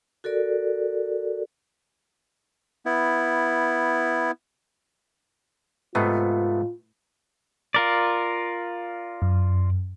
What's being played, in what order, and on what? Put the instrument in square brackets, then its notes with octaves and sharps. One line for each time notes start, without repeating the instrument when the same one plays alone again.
[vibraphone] F#4 A4 A#4 D5
[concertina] B3 E4
[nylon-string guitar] G#2 [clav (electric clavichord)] C3 A3 B3 [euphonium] F4
[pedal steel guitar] F4 A#4 D5
[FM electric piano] F#2